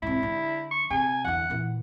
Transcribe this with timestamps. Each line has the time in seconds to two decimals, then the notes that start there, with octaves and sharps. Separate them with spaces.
0.02 G#2 C3 E4
0.23 D3
0.71 C#6
0.90 C3 G#5
1.24 E2 D3 F#5
1.50 A#2 E3